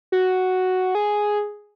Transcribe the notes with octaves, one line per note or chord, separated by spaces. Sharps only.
F#4
G#4